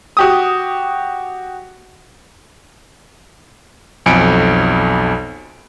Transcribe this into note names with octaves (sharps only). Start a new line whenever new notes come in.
F#4 G4 D#6
B1 F2 G#5 C#7 D7